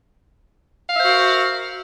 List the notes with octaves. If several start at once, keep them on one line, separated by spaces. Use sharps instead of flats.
F#4 A#4 C5 E5 F5